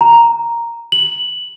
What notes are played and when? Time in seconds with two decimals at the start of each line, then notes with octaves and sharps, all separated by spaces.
0.01 A#5
0.92 F#7